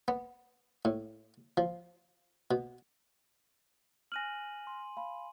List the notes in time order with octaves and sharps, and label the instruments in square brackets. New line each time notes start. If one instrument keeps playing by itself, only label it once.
[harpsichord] B3
A2
F3
B2
[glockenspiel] G#5 D#7 F#7 [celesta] F6 F#6 A#6
[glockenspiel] C6
[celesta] F5 B5